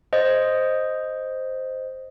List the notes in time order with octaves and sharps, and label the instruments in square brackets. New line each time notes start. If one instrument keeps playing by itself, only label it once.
[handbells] C5 D#5